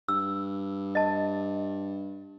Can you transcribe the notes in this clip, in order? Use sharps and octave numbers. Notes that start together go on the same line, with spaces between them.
G2 E6
D#5 A5